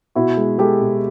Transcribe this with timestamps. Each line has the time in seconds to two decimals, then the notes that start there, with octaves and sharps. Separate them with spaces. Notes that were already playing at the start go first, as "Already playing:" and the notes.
0.15 B2 E4 F#4
0.37 G#3
0.58 G#3 G4 A4
0.81 B2